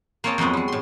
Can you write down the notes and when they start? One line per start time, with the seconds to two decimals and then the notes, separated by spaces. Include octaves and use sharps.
0.24 A#3 C4 C#5 D#5 A5
0.38 F2 B2 F#3 G#3 B3
0.53 G3 G#3
0.68 A2 C6